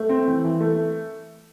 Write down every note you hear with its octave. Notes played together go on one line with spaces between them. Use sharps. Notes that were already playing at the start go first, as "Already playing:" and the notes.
Already playing: A3
C4
E3
E3
A3